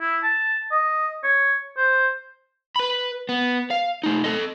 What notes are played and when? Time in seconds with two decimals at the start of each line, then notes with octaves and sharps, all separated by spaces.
0.01 E4
0.23 A5
0.72 D#5
1.23 C#5
1.77 C5
2.76 B4 B5
3.29 B3
3.71 F5
4.03 A3 D#4
4.24 A4 D#5